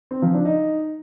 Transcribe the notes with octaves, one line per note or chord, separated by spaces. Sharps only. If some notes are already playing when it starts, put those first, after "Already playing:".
C4
F3
D4
D#4